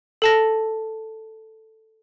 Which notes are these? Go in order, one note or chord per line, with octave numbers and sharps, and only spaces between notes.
A4 A5 A#6